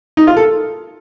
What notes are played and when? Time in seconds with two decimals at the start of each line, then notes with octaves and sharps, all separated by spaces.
0.17 D#4
0.27 F4
0.37 A4